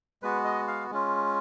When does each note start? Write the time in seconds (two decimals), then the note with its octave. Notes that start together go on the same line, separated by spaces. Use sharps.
0.22 G#3 B3 F#4 B4
0.45 D#5
0.68 F5
0.91 G#3 C#4 F4